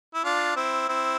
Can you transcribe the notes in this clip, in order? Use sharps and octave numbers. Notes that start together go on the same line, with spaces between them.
E4
D4 F4
C4 E4
C4 E4